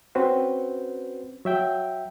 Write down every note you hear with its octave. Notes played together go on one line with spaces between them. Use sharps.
C4 C#4 F#4 B4 C5
F#3 E5 G5